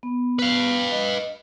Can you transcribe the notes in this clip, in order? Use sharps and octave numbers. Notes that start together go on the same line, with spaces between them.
B3
B4 F5
D#5